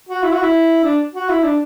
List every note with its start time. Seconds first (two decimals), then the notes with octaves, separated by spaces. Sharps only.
0.09 F#4
0.23 E4
0.32 F#4
0.42 E4
0.84 D4
1.14 F#4
1.29 E4
1.44 D4